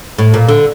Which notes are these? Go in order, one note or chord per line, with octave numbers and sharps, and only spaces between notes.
A2
A#2
D3